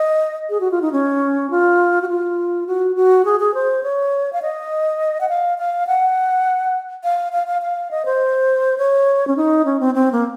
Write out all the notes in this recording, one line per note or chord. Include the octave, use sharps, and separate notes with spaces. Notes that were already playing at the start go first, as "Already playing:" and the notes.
Already playing: D#5
G#4
F#4
F4
D#4
C#4
F4
F#4
F4
F#4
F#4
G#4
G#4
C5
C#5
F5
D#5
F#5
F5
F5
F#5
F5
F5
F5
F5
D#5
C5
C#5
C#4
D#4
C#4
C4
C4
A#3